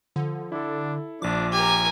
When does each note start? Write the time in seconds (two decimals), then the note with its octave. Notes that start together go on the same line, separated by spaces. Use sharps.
0.16 D3 F3
0.52 D4 E4 A4
1.22 A#1 F3 D4 D6
1.53 G4 A#4 G#5